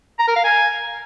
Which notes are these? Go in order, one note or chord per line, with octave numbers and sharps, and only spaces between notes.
A#5
A#4
F5
G#5